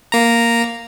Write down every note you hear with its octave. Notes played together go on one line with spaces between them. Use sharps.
A#3 A#5